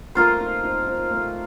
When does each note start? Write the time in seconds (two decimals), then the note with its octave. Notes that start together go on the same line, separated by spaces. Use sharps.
0.15 A3 A#3 C4 F4 C5
0.39 C4 D#4
0.63 C4 D#4
0.86 C4 D#4
1.10 A3 C4